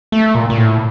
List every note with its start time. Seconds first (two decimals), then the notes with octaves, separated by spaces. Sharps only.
0.12 A3
0.35 A#2
0.50 A#2
0.57 A2